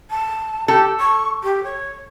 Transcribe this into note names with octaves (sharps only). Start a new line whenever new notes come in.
A5
G4 A4
C#6
G4
C#5